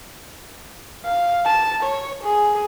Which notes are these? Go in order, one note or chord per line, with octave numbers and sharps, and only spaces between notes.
F5
A5
C#5
G#4